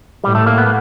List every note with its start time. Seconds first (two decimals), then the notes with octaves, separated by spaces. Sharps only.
0.24 A2 G3
0.35 A3
0.46 A#3
0.58 B3